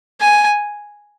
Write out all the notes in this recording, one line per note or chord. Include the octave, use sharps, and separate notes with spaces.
G#5